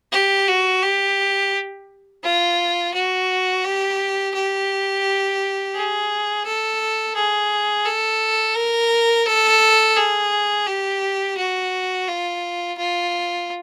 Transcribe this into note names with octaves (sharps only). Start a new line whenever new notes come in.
G4
F#4
G4
F4
F#4
G4
G4
G#4
A4
G#4
A4
A#4
A4
G#4
G4
F#4
F4
F4